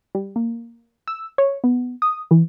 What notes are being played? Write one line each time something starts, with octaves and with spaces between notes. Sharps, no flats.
G3
A#3
E6
C#5
B3
D#6
E3